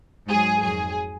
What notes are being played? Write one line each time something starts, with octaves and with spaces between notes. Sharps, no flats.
G#2 F#3 G#4
F2 D#3 F#3 G#4